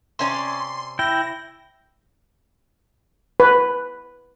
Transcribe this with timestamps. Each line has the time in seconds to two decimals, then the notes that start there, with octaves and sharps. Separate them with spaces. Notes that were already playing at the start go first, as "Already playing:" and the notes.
0.19 C3 C#4 D5 C6
0.99 E4 G5 A#6
3.40 B4